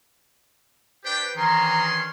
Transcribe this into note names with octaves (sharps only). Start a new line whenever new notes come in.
D4 G4 B4 C5 D5 G5
D#3 E3 C#4 D4 G#4 A#5 C6